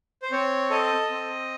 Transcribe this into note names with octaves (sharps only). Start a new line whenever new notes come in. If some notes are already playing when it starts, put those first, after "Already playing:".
C5
C4 C#5
A4 D#5
C4